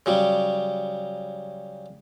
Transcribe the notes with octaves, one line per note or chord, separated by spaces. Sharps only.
C#3 F#3 G3